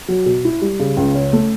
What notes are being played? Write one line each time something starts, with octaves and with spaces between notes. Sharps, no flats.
F#3
B2
E4
G3
C#3
C#2
C#4
A3